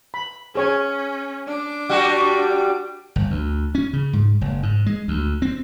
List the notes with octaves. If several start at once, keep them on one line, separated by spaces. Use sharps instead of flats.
B5
C#4 G#4 C#5 G#5
D4 D6
G3 F#4 F#5
G1
D2
C#4
C#3
G#2
F#1
G#2
G#3
D2
C4